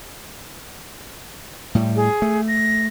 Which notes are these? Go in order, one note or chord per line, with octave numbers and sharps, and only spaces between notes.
A2 G3
G#4
A3
A#6